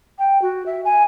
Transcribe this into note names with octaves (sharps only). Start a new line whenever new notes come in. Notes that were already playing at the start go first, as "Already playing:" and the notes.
G5
F#4
E5
G#5